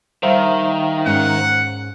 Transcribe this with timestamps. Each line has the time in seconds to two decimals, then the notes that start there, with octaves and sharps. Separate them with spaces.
0.23 D#3 G3 C5 E5 F5
1.06 G#2 C#4 F#5 G#5